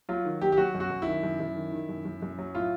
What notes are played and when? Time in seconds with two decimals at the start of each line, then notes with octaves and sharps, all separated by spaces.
0.09 F#3 F4
0.25 D#3
0.42 F#3 G4
0.52 G4
0.57 F#3 F#4
0.74 F#2
0.80 F#4
0.90 F#2
1.02 D#3 E4
1.23 F#2
1.40 F#2
1.56 D#3
1.72 D#3
1.89 F#2
2.05 F#2
2.22 F#2
2.39 F#3
2.54 A2 F4